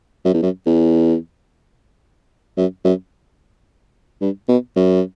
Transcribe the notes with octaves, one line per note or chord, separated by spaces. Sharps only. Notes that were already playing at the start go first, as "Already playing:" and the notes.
F#2
E2
F#2
E2
F#2
F#2
G2
B2
F#2